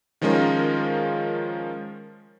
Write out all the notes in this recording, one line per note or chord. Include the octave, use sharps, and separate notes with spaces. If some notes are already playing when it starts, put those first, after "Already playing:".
D#3 F3 G#3 C#4 F4 A#4